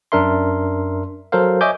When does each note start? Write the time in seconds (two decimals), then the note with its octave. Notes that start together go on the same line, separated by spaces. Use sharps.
0.12 F#2 D4 A#4 E5 C6
1.32 F#3 A4 A#4 C5 F5
1.61 C#5 D#5 E5 G#5 D6 G6